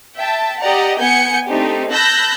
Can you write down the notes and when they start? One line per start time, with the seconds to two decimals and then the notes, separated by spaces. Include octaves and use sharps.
0.16 E5 G5 A5
0.61 G4 D5 D#5 F#5 A#5
1.00 B3 F#5 G#5 G6 C#7
1.47 A3 C4 D4 D#4 G4
1.90 A5 B5 E6 F#6 G6 A#6